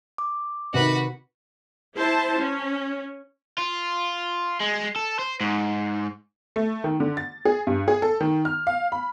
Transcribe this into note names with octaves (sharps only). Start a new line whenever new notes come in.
D6
C3 D#3 F#4 B4
E4 C5 A5
C#4
F4
G#3
A4
C5
G#2
A3
D#3
D3
A6
G#4
G2
G#4
A4
D#3
F6
F5
B5